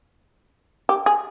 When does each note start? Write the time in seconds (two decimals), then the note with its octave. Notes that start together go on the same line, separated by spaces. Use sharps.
0.89 G4
1.06 G#4